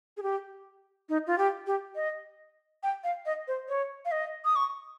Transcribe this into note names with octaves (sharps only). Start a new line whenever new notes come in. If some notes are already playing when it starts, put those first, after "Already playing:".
G#4
G4
D#4
F4
G4
G4
D#5
G5
F5
D#5
C5
C#5
F5
D#5
D#6
C#6